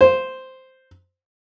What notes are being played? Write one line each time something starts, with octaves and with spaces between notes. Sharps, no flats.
C5